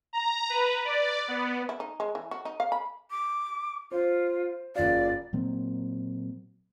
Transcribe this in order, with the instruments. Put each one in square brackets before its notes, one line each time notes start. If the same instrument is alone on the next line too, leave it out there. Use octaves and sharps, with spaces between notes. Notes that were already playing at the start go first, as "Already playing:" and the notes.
[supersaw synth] A#5
B4
D5
B3
[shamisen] E4
D#4
G#3
E3
F#4
D#4
F5
B5
[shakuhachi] D6
[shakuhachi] F4 [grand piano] C5
[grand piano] F#1 F4 [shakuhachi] D5
[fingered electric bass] A#2 F#3 A#3 C4